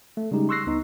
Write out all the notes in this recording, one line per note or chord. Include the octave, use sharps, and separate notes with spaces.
A3
C#3 G3 G#3 D#4 G4
C6 C#6 E6 F#6 A#6 C7
C#2 B3 D#4